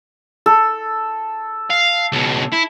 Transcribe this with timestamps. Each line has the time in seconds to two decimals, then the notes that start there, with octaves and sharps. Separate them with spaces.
0.46 A4
1.70 F5
2.12 C#2 B2
2.52 E4